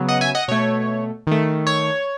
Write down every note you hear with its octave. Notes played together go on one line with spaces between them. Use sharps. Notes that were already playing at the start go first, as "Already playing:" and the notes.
Already playing: C#3 F#3 B3
D#5 F#5
E5 G#5
D#5 F#5
B2 A3 C#5
D#3 A3
C#5